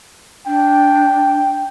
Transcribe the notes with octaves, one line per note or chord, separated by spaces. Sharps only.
D4 G5